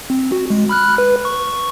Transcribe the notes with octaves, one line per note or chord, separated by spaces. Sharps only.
C4
F#4
G#3
B5 F6 F#6
B4
C#6